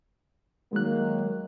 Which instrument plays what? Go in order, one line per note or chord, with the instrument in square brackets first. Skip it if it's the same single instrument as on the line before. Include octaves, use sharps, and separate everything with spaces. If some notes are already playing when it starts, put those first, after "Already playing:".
[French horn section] D#3 F#3 A#3 [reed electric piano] G#3 F#6